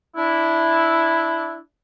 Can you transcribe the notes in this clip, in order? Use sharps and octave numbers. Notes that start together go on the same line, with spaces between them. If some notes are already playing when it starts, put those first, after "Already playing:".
D4 E4